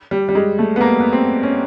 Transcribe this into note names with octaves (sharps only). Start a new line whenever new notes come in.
G3
G3
G#3
A3
B3
A#3
B3
C4
C#4